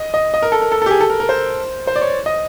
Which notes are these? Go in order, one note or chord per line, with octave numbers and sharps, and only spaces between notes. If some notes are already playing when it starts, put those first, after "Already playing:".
Already playing: D#5
D#5
D#5
A#4
A4
A#4
A4
G4 A4
G#4
A4
A#4
A#4
C5
C5
D5
C#5
D#5